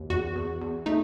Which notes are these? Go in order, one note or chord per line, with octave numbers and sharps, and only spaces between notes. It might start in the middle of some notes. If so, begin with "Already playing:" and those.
Already playing: D#2
E2 F#4
E2
E2
A3 D#4